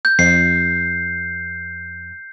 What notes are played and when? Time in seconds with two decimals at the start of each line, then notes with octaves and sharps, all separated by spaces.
0.05 G6
0.19 F2 C7